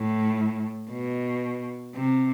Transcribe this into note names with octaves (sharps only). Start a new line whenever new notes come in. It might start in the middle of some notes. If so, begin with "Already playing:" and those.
Already playing: A2
B2
C3